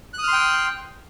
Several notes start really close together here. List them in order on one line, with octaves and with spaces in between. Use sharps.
F#6 D#6 F6 C6 G5